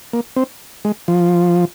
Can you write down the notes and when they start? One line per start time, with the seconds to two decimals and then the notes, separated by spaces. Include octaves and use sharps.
0.13 A#3
0.36 C4
0.85 G#3
1.08 F3